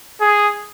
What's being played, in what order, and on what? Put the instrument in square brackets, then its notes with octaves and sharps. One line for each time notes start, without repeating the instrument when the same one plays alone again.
[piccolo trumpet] G#4